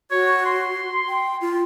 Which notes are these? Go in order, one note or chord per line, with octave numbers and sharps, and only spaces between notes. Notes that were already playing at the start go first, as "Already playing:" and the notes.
F#4 C#5
C6
G5
F4